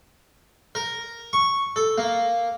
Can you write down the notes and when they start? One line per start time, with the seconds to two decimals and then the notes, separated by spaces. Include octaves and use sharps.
0.75 A#4
1.33 C#6
1.76 A4
1.98 A#3